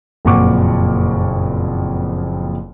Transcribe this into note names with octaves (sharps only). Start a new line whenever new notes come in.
F#1 F2 A#2 F#5 C#6 D6